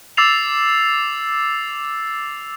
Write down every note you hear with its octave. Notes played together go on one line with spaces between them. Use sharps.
D6 E6 A6 C7 F7